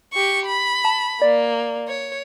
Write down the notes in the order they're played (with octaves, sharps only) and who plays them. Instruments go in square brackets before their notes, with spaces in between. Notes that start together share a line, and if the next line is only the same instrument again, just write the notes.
[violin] G4 C#6
B5
[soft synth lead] A5
[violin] A#3 [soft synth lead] D5
[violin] C#5